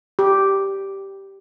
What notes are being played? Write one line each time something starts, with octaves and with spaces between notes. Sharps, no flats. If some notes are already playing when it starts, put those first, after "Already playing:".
G4